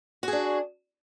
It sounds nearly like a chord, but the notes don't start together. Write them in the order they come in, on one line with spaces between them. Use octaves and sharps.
F#4 G#4 D4